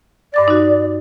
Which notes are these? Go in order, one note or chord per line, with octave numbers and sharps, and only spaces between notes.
G2 D5 D6 A6
D#4 F#4